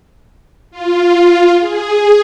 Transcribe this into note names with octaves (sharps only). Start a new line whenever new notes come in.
F4
G#4